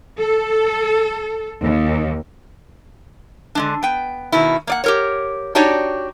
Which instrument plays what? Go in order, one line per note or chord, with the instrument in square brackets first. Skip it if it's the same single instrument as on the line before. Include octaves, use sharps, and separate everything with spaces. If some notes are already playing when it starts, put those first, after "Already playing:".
[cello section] A4
D#2
[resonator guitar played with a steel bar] D3 G#3 D4
B3 G5
B2 D#3 E4
A#3 D5 F#5
G4 A#4 C#5
D4 D#4 F#4 G4 C#5 D5